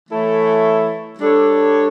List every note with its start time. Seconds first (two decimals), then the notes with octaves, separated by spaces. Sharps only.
0.09 E3 A3 E4 A4 C#5
1.18 G3 D4 A4 C#5